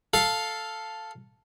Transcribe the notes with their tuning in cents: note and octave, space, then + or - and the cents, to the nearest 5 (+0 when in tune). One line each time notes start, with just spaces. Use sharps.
A4 +0 F5 +0